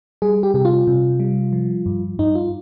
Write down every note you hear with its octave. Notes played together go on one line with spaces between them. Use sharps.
G3 G#4
G4
C3 G4
F4
C3
G3
F3
G2
G2 D#4
F4